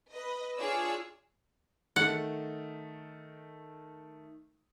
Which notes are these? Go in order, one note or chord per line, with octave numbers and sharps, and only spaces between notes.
B4 D#5
D4 F4 G#4 C#5 D5 E6
D#3 A3 F#5